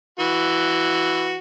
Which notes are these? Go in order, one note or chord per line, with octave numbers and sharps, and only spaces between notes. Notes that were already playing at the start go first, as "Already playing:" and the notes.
E3 F#4